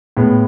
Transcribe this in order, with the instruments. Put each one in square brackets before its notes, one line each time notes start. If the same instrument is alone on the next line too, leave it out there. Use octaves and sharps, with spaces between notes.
[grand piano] A2 G#3 B3